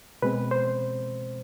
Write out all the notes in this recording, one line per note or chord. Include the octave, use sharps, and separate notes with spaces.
B2 G#3 C4 B4
C5